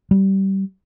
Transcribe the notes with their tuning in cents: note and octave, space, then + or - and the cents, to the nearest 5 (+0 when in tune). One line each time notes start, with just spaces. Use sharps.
G3 -20